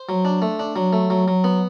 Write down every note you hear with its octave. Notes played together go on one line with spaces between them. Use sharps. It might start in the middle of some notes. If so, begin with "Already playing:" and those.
Already playing: C5
F#3
D4
A3
D4
F#3
A3
F#3
F#3
B3